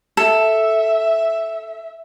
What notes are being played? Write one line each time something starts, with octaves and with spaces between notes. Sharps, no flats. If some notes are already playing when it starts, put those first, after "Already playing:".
A4 E5